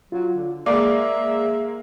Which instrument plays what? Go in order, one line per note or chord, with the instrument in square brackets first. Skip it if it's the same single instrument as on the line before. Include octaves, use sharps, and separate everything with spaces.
[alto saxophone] F#3 [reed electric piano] F4
[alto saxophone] D3
[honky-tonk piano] G#3 A#3 [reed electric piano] G#4 D5 D6 [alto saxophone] E5